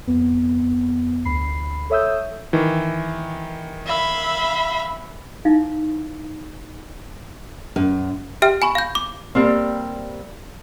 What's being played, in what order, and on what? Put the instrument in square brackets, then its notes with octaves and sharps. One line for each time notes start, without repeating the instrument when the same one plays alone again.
[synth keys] F2 B3
D2 B5 C7
A4 C#5 E5 D#6 E6 G6
[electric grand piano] D#3 E3
[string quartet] E5 F5 B5
[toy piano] D#4 E4 F5
[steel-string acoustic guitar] F#2
[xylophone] G4 E5 G5 F6
G#5 B5 C#6
F5 G6
D6
[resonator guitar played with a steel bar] G3 A#3 C4